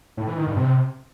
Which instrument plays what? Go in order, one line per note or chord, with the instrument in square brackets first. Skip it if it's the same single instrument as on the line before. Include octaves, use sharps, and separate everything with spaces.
[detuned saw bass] A2
E3
D#3
G2
C3